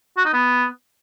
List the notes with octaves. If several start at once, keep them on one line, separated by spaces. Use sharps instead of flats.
F#4
D#4
B3